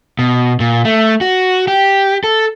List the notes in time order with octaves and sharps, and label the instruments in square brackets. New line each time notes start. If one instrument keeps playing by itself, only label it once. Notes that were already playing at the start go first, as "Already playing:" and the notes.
[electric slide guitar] B2
A#2
A3
F#4
G4
A4